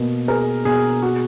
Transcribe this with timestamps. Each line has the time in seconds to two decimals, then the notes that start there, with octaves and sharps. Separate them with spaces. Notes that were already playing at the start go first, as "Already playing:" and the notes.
Already playing: B2 A#3
0.28 G#4 A#4
0.65 B2 G#4
1.02 F#4 G#4